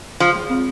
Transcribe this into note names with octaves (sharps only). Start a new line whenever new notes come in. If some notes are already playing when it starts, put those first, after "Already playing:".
F3 G#4
G#3
C4